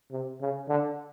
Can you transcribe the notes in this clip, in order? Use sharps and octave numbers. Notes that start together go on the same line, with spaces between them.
C3
C#3
D3